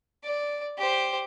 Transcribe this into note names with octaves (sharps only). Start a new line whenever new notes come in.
D5
G4 C5